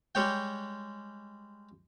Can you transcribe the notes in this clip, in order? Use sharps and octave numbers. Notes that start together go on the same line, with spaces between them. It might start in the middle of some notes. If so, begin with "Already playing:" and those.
G3 G#3 C#5 G5